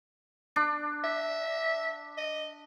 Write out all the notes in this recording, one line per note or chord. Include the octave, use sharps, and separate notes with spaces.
D4
E5
D#5